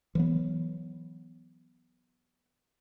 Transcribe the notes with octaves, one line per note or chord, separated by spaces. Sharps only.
E3 F#3 B3